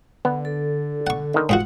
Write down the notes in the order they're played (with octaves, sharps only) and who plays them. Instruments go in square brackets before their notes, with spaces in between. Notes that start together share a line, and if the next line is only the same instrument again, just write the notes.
[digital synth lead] D3 [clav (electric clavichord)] B3
[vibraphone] A4
[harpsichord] F#5 C#6
[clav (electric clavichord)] D3 D#3
[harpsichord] G#2 F4 F#4 [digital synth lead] F#5